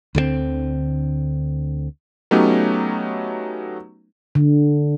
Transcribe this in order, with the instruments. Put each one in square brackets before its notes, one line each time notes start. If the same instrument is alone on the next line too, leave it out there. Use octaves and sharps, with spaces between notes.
[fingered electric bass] D2 D3 F3 C4
[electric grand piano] F#3 A3 B3 C#4 D#4 G4
[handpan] D3